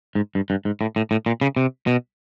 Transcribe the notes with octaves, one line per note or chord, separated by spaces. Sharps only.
G#2
G2
G2
G#2
A2
A2
A2
A#2
C#3
C3
B2